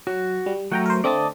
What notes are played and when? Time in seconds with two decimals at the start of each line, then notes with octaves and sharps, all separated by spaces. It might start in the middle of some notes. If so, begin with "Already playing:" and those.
0.07 F#3 F#4
0.46 G3
0.72 F#3 A3 F#5 G5 A#5
0.86 A#4 C5
1.04 D3 A3 C4 D5 D#5 A5